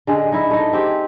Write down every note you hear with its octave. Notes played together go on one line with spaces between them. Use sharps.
D3 G#3 G#4
D#4 E4
A3 D#4
C4 G4 G#4